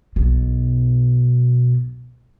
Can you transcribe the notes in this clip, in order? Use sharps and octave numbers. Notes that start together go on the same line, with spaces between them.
B1 B2